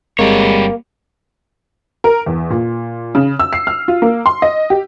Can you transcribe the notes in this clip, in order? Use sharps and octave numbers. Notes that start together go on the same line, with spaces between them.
G1 G3 G#3 A#3 C4 C#5
A#4
E2
A#2
C#3
E6
C7
F6
F4
A#3
C6
D#5
G4